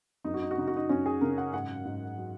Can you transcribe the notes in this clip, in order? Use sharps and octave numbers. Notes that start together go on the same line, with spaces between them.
F#2 D#4
F#4
D#4
F#4
C#3 D#4
F#4
D#4
F#2 C#4
G#4
C#3 A#4
F#5
G#2 F#5
G#2
F#3